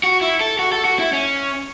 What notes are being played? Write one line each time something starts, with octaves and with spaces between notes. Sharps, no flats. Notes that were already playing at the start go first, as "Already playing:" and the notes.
F#4
E4
A4
F#4
A4
F#4
E4
C#4